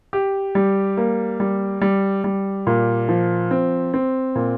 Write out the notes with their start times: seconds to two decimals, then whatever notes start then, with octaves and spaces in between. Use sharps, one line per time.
0.13 G4
0.55 G3
0.97 A#3
1.40 G3
1.81 G3
2.24 G3
2.67 A#2
3.09 F3
3.51 C4
3.94 C4
4.35 A#2